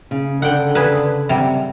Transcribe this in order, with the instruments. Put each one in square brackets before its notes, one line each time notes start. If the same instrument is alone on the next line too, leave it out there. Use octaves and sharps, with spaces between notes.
[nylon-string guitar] C#3
[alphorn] D3 [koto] F#5 G5
[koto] G#4 B4
C3 F#3 G3